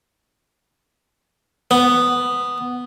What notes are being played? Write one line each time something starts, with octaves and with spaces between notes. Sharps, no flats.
B3